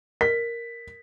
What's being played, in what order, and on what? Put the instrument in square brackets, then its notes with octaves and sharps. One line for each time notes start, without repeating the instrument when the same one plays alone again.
[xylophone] A#4 [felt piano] B6